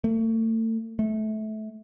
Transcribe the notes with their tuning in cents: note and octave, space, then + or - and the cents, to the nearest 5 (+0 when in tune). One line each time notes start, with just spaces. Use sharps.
A3 +35
A3 -25